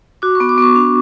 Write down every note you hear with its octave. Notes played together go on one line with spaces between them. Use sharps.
F#4 D6
C#6
B3
D6
B3 C#6
D4